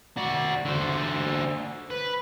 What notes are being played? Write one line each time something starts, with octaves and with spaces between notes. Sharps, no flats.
F#4 D5
D3 C5
B4